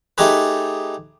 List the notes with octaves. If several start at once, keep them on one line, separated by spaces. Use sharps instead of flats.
A3 D#4 G4 G#4 B4